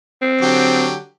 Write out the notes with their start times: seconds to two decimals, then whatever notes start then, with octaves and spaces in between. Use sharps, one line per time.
0.22 C4
0.41 D3 F#3 G4